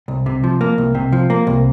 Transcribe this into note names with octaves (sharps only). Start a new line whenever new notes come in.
C2
C3
F3
A#3
C2
C3
F3
A#3
C2